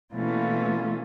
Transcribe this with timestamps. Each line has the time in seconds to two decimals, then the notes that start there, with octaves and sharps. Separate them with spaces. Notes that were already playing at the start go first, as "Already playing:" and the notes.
0.14 B2 E3 A3 A#3 C#4 F4